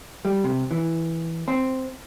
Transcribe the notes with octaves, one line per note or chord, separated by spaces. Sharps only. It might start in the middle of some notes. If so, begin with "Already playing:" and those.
G3
C3
E3
C4